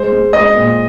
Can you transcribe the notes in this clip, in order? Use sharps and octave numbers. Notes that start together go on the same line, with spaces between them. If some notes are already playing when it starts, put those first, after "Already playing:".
Already playing: G#3 C5
G#3
G#3 D#5
A#2